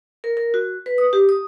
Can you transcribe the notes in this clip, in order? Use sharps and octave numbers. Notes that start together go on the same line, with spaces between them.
A#4
A#4
F#4
B4
D#6
G4
D#6